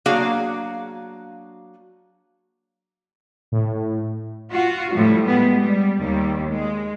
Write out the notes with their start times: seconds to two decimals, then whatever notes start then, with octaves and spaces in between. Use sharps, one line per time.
0.06 F#3 A#3 D4 F#4 G#4 F5
3.52 A2
4.51 F4 F#4
4.92 A2 F3 G3
5.25 G3 G#3 B3
5.58 G3
6.00 D#2 G3
6.51 G#3